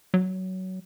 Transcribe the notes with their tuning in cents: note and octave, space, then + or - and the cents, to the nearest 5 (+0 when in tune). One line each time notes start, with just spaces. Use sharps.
F#3 +15